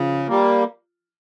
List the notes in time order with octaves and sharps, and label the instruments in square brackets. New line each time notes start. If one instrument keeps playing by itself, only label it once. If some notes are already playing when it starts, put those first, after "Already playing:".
Already playing: [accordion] C#3 [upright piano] F3 F4
[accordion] G3 A#3